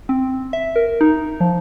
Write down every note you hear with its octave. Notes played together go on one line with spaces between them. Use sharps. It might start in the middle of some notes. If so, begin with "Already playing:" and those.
C4
E5
A#4
D#4
F3